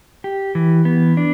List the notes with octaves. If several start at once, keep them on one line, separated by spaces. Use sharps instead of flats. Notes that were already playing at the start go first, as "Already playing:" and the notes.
G4
E3
B3
D4